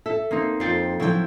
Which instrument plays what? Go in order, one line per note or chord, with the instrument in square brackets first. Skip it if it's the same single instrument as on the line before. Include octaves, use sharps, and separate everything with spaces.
[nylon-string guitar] A4 [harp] E5
[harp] A#3 C4 D#4
[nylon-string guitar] F2 [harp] G5 A6 C7
[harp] F3 F#3 A4 [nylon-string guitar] E4 G5